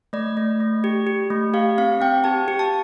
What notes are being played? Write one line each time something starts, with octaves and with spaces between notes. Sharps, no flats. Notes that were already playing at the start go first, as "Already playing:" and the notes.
A3 D5
A3
A3
G4
G4
A3
G4 F5
C4 F5
C4 G5
G4 A5
G4
A5